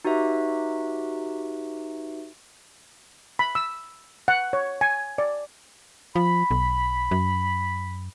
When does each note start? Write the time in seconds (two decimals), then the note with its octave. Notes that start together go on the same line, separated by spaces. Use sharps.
0.05 D#4 F#4 G4 B4 E5
3.39 B5
3.55 E6
4.28 F#5
4.53 C#5
4.81 G#5
5.18 D5
6.16 F3 B5
6.51 B1
7.11 F#2